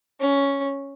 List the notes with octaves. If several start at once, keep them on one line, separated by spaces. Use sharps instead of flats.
C#4